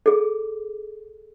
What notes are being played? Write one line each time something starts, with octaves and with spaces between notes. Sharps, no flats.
G#4 A4